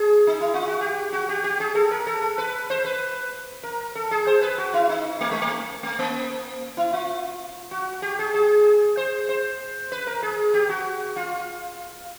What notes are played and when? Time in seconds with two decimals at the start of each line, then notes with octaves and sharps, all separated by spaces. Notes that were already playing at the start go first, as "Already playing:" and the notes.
Already playing: G#4
0.27 D#4
0.41 E4
0.54 F4
0.68 F#4
0.81 G4
1.12 F#4
1.29 G4
1.44 G4
1.60 G#4
1.75 A4
1.91 A#4
2.07 A4
2.22 A4
2.38 B4
2.70 C5
2.85 B4
3.63 A#4
3.95 A4
4.11 G#4
4.27 C5
4.42 B4
4.58 F#4
4.74 E4
4.89 D#4
5.21 A3
5.31 G#3
5.41 A3
5.83 A3
5.99 A#3
6.77 E4
6.93 F4
7.71 F#4
8.02 G4
8.19 G#4
8.34 G#4
8.97 C5
9.29 C5
9.92 B4
10.07 A#4
10.23 G#4
10.54 G4
10.69 F#4
11.16 F4